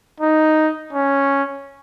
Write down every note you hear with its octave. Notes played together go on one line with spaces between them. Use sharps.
D#4
C#4